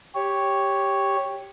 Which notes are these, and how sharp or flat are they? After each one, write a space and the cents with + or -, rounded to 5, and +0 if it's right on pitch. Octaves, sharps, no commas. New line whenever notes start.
G4 +5 C#5 +0